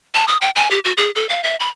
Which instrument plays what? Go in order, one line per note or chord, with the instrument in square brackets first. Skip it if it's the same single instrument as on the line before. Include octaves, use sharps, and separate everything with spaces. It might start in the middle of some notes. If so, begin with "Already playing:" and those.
[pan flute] A5
D#6
G5
G#5
G4
F#4
G#4
A4
F5
E5
B5